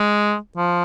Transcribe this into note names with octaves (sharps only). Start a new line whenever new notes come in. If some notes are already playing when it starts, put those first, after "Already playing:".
Already playing: G#3
F3